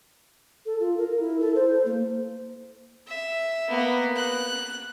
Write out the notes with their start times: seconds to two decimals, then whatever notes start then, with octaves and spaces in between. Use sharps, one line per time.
0.65 A4
0.80 F4
0.98 A#4
1.20 E4
1.40 A4
1.55 C5
1.85 A#3
3.07 E5
3.69 A#3 B3
4.16 F#6